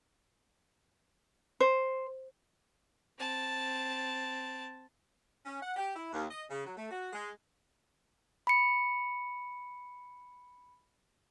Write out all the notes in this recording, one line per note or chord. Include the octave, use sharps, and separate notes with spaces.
C5
C4 A5
C#4
F#5
G4
E4
D#2
D#5
C#3
F#3
A3
F#4
G#3
B5 C#7